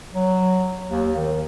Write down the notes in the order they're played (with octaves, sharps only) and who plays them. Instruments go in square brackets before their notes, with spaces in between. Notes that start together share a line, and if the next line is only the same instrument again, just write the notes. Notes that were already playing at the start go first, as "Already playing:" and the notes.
[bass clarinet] F#3
D#2
D#3